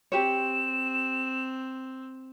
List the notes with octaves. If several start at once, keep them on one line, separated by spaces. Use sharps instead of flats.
C4 G4 C#5 E7